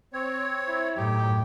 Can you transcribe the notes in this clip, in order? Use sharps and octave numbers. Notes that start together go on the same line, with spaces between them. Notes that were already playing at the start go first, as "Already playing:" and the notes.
C4 C#5
E4
F#2 A2 D#4 G4